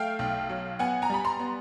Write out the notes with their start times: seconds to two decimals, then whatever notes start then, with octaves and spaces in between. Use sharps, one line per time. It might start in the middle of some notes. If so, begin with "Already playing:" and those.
Already playing: A3 F5 G5
0.19 B1
0.49 F#3
0.79 B3 F#5 G#5
1.02 G#5 A#5
1.10 G3 B5
1.25 A#5 C6
1.39 B3